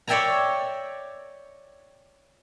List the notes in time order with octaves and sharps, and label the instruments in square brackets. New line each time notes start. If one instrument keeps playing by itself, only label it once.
[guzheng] C#5 D5 E5 G5 G#5 A#5